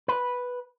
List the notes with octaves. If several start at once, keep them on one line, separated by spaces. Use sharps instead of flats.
B4